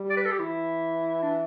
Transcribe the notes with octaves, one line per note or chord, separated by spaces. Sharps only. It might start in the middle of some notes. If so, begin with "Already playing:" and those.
Already playing: G3
D5
B4
A4
G4
E3 E4
D4